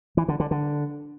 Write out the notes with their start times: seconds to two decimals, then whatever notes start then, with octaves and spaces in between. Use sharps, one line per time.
0.17 E3
0.28 D3
0.40 D3
0.51 D3